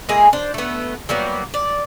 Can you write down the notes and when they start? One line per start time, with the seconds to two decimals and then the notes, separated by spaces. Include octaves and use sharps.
0.09 G#3 A#3 E4 G#4
0.33 D4 C5
0.54 A3 B3
1.09 F#3 G3 A#3 B3
1.54 D5